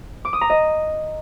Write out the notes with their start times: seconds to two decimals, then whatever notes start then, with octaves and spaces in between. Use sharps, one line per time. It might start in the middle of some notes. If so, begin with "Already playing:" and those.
0.25 D6
0.33 D#6
0.41 A#5
0.50 D#5